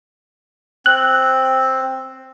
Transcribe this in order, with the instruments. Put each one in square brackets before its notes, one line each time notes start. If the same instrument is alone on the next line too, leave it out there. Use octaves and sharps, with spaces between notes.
[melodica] C4 [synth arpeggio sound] F#6